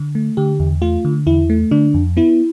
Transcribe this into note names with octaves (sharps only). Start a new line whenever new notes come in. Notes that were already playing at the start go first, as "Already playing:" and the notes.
Already playing: D3
A3
D3 G4
E2
A3 F4
D3
E2 E4
A3
D3 D4
F2
B3 E4